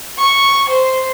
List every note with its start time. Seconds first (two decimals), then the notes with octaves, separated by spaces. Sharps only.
0.18 C#6
0.69 C5